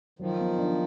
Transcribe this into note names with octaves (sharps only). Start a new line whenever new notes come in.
D#3 F3 F#3
B3
D4